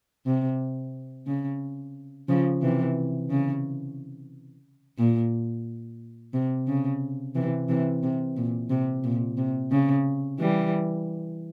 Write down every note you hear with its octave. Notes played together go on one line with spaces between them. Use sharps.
C3
C#3
C#3 F3
C3 E3
C#3
A#2
C3
C#3
C3 E3
C3 E3
C3
A#2
C3
A#2
C3
C#3
E3 G3